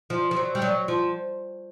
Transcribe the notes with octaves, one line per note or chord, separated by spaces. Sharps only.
F3
F3
F#3
G3
F#3
F3